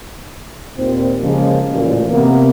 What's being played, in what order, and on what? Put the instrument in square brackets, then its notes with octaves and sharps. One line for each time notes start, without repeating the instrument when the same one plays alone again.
[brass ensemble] D#2 A#2 C4
C#3 F3 G#3 A#3
A1 F#2 A#2
C3 A#3 B3